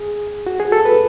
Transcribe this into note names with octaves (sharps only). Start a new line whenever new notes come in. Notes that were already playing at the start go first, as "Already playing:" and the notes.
Already playing: G#4
F#4
G#4
A4
B4